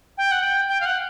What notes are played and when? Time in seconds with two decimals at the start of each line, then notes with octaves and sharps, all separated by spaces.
0.18 G5
0.32 F#5
0.43 G5
0.68 G5
0.81 F5
0.86 F#5